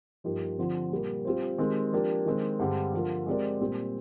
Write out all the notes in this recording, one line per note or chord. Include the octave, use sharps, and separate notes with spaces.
G2 F3 A#3 D#4 G4
D3 F3 C4
A#2 G3 A#3
G3 C4 F4 C5
D#3 G#3 C4 G4
F3 A#3 D4 G4
D#3 G#3 C4
G2 D3 G#3 C4 G4
D3 F3 A#3 F4
G#3 C4 G4 A#4 D5
A#2 G3 C4